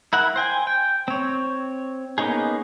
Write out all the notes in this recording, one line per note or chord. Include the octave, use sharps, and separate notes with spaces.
E4 A#4 F#5
C5 G5 G#5
G5
C4 C#5
A#3 B3 C#4 D#4 G#4